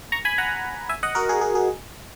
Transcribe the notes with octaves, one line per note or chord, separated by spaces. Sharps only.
A#5 C#6
G#5 B5
F#5 A#5
E5 G#5
D#5 F#5
F#4 A#4
G#4
G#4
G#4